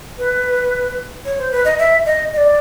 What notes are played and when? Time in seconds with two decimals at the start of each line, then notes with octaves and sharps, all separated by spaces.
0.18 B4
1.25 C#5
1.39 C5
1.52 B4
1.65 D#5
1.79 E5
2.06 D#5
2.33 D#5
2.37 D5